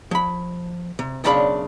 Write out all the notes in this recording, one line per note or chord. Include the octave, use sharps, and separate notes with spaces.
F3 B5
C3
B1 F#2 C#3 D4 F5 B5